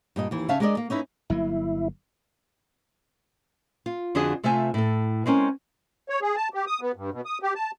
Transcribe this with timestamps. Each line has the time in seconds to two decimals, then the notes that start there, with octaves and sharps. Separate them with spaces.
0.16 G2 A#2 D#5
0.31 D#2 E3
0.49 C#3 C#4 E5 F5 A5
0.60 G#3 D4 A#4 C5 D5 D#5
0.77 A#3
0.90 C#4 D#4 E4 B4
1.30 G1 F#3 A#3 E4
3.86 F4
4.15 F2 D3 D4 F#4 G#4 D#5
4.43 C3 A3 F4 C5 E5 G#5
4.74 A2 A4
5.26 G#3 C4 C#4 A#4
6.09 C#5
6.22 G#4
6.36 A5
6.54 G4
6.67 D#6
6.81 B3
6.96 G2
7.13 B2
7.25 D#6
7.42 G4
7.55 A5